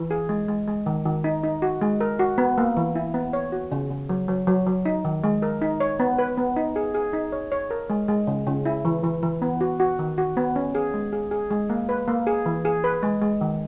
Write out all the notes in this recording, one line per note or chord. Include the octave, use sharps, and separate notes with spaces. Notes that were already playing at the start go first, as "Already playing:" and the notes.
Already playing: E3
G#4
G#3
G#3
G#3
D#3
D#3
D#4
D#4
F#4
G#3
A#4
F#4
B3
A#3
E3
E4
B3
C#5
F#4
C#3
C#3
F#3
F#3
F#3
F#3
D#4
D#3
G#3
A#4
D#4
C#5
B3
B4
B3
D#4
G#4
G#4
D#4
C#5
C#5
A#4
G#3
G#3
C#3
C#3
E4
E3
E3
E3
B3
F#4
F#4
D#3
F#4
B3
C#4
G#4
G#3
G#4
G#4
G#3
A#3
B4
A#3
G#4
E3
G#4
B4
G#3
G#3
D#3